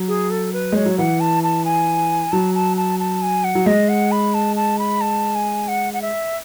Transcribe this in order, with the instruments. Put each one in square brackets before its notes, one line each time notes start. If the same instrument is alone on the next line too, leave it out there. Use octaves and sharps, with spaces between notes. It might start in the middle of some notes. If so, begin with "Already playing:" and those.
Already playing: [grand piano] F#3
[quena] G#4
A4
B4
[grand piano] G#3 [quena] C#5
[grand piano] F#3
[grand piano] E3 [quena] F#5
[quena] A5
A5
G#5
[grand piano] F#3 [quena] A5
[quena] A5
A5
A5
G#5
F#5
[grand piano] F#3
[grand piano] G#3 [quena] D#5
[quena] F#5
B5
A5
A5
B5
A5
G#5
F#5
F#5
E5